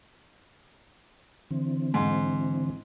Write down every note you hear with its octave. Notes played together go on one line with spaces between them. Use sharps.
D3 E3 C4
G#2